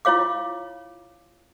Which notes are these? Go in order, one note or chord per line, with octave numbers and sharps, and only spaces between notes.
E4 F4 C#5 F5 D6